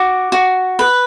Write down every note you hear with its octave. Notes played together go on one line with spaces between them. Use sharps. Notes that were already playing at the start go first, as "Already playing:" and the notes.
Already playing: F#4 D6
F#4
B4